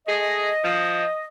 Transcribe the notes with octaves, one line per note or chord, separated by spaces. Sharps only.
A3 G#4 D#5
F3